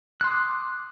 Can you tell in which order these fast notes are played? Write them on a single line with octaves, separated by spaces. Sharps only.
F#6 C6 D#6 D6